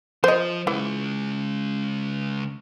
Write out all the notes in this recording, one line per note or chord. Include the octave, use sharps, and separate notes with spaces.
F3 C5 D#5
C#3 E3 G#3